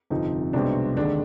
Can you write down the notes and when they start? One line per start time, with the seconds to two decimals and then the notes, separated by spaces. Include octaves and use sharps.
0.10 G1 F2 C3 F3 D#4
0.53 C2 B2 G#3 C4 D4
0.97 D#2 D3 G#3 D4